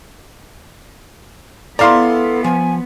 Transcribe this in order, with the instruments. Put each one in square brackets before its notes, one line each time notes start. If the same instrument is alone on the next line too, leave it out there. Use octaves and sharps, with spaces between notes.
[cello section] B3 [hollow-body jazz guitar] E4 E5 A#5 [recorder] A4 [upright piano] D5 F5 C6
[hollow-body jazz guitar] F3 [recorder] G#5